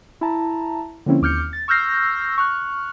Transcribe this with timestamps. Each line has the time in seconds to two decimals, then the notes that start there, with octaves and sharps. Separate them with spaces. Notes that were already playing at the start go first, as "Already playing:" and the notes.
0.21 E4 A5 A#5
1.06 D3 F3 A#3 C4 C#4 E4
1.22 D#2 D6 F6 G6 C#7
1.53 A6
1.68 C#6 E6 F6 G6 A#6 C7
2.38 C#6 F6 F#6